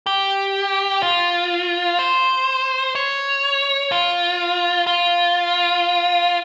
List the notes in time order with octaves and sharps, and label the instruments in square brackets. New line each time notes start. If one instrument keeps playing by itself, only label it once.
[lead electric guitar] G4
F4
C5
C#5
F4
F4